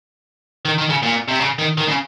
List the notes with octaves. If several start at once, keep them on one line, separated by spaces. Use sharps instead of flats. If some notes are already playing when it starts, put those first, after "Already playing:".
D#3
D#3
C#3
A#2
C3
C#3
D#3
D#3
C#3